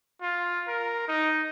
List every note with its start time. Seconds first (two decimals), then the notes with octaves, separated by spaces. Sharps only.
0.21 F4
0.68 A#4
1.08 D#4